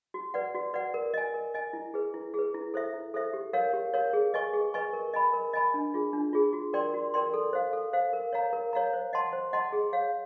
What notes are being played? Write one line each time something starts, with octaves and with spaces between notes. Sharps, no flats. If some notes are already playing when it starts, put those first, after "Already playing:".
F#4
B4 D5 F#5
F#4
B4 D5 F#5
A#4
D#5 G#5
A#4
D#5 G#5
E4
G#4 B4
E4
G#4 B4
E4
A4 C5 E5
E4
A4 C5 E5
G4
A#4 C#5 F5
G4
A#4 C#5 F5
G#4
B4 D#5 G#5 C#6
G#4
B4 D#5 G#5 C#6
A#4
D#5 G#5 B5
A#4
D#5 G#5 B5
D4
F4 G#4
D4
F4 G#4
F#4
A#4 D5 G5 C6
F#4
A#4 D5 G5 C6
A4
C5 F5
A4
C5 F5
A#4
C#5 F5 A#5
A#4
C#5 F5 A#5
C5
D#5 F#5 A5 C6
C5
D#5 F#5 A5 C6
G#4
C#5 F5